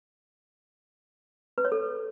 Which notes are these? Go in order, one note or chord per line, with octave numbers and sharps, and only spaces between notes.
B4
C#5
A4